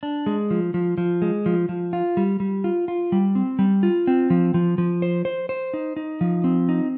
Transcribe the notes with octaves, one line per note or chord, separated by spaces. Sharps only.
D4
G#3
F3
F3
F3
G#3
F3
F3
F4
G3
G3
F4
F4
G3
C4
G3
F4
C4
F3
F3
F3
C5
C5
C5
D#4
D#4
F3
C4
D#4